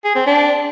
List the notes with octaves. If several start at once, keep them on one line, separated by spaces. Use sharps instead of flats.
G#4
C4
D4